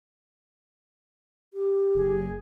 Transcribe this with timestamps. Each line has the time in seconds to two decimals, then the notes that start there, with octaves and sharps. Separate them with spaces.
1.53 G4
1.95 F#1 G#4